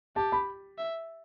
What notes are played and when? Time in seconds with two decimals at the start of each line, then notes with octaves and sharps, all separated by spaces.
0.16 G4 A5
0.32 B5
0.78 E5